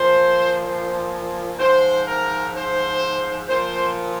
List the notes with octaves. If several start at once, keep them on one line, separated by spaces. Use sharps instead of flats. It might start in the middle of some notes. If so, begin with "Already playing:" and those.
Already playing: A#2 F3 C5
C5
G#2 F3 C5
A#4
C5
A#2 F3 C5